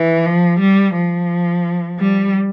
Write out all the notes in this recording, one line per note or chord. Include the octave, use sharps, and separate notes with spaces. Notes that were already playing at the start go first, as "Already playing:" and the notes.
Already playing: E3
F3
G3
F3
G3